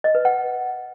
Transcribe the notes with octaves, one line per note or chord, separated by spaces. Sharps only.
D#5
B4
F#5